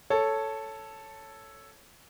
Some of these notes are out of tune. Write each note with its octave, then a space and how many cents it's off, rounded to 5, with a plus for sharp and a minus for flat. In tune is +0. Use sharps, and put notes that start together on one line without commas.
A4 +0 C#5 +0